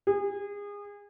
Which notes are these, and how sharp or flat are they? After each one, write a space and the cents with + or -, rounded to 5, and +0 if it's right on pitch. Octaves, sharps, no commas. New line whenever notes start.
G#4 -30